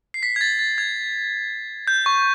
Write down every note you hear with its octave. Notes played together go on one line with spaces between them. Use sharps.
C7
B6
G#6
A6
A6
G#6
G6
C#6